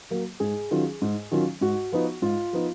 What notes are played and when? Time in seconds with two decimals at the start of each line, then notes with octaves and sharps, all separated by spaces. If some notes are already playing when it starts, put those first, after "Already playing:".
0.11 F#3 A#3
0.40 G#2 G#4
0.71 D#3 F#3 C#4 F4
1.02 G#2
1.31 D#3 F#3 C#4 F4
1.61 G#2 F#4
1.92 F3 B3 D#4
2.22 G#2 F4
2.53 F3 B3 D#4